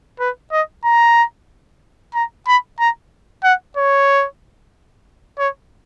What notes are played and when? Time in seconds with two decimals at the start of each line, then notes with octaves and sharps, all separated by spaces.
0.20 B4
0.52 D#5
0.85 A#5
2.14 A#5
2.47 B5
2.80 A#5
3.44 F#5
3.77 C#5
5.39 C#5